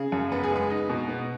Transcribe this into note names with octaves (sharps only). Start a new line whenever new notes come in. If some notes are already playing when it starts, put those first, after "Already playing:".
Already playing: C#3 G#4
F#2
B3 B4
G#4
G#3 B4
D#4
B2
B3